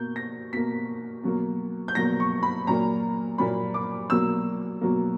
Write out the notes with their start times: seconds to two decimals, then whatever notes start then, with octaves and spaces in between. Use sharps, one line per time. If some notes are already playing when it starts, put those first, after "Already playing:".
Already playing: B2 A#3 G6
0.16 A#6
0.53 B2 A#3 B6
1.23 B2 F#3 A#3
1.88 G6
1.95 B2 F#3 A#3 A#6
2.20 C#6
2.43 B5
2.67 A#2 F#3 A#3 A#5
3.38 A#2 F#3 A#3 B5
3.74 D6
4.10 B2 F#3 A#3 E6
4.81 B2 F#3 A#3